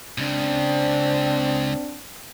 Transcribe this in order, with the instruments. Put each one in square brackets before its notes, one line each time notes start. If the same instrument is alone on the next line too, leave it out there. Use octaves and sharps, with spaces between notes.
[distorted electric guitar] C#2 C#3 [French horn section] C4 D4